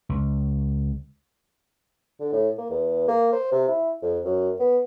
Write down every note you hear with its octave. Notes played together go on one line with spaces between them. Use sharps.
C#2
D3
A2
A#3
E2
A#3
C5
C3
E4
F2
F#2
B3